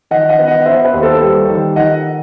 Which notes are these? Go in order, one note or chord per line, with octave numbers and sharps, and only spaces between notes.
D#3 D#5 F#5
D#5 F#5
B3
D#5 F#5
B3 C5 E5
B4
D#2
A4 C5
G3
D#3
D#3 D#5 F#5